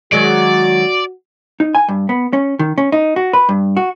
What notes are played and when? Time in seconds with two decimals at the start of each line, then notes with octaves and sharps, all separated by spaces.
0.12 D#3 F#3 G#3 F#4 D5
1.60 D#4
1.75 G#5
1.88 G2
2.09 B3
2.33 C#4
2.59 D#3
2.78 C#4
2.92 D#4
3.16 F#4
3.33 B4
3.49 G2
3.77 F#4